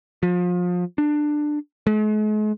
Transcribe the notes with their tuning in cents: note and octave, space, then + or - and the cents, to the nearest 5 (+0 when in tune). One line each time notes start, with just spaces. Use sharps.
F3 +30
D4 +15
G#3 +45